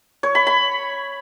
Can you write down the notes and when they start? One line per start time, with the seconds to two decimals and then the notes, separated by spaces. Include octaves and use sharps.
0.23 C#5
0.35 B5
0.47 B5